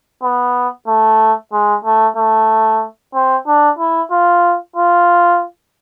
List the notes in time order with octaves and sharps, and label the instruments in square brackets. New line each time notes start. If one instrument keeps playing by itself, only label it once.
[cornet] B3
A3
G#3
A3
A3
C4
D4
E4
F4
F4